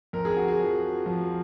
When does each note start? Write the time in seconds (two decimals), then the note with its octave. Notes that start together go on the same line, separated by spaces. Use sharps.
0.13 F2 A#4
0.25 G#4
0.37 F#4
0.48 G#4
0.60 F3
1.06 F3